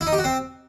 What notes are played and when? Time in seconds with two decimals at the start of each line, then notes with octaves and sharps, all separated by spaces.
0.01 E4
0.07 D#4
0.13 G4
0.18 F#4
0.24 C4